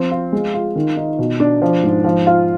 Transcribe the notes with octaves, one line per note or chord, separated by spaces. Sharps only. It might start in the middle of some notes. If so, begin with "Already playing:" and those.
Already playing: F3 C4
F4
G#3
F4
D#3
D#4
B2
D4
F3
G#2
F3
F4